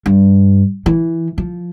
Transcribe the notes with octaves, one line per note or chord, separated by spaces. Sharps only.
G2
E3
F3